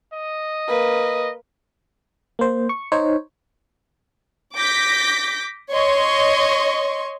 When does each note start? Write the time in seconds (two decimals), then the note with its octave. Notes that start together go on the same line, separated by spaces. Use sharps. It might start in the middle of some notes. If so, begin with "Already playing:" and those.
0.13 D#5
0.68 A#3 B4
2.39 A#3 C5
2.69 C#6
2.92 D#4 C5 C#5
4.55 D6 G6 A#6 B6
5.70 C#5 D#5 C6 C#6